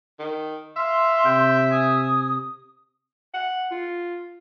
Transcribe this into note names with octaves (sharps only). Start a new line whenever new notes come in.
D#3
E5 F5 C6
C3 G5
G#5 D#6
F#5
F4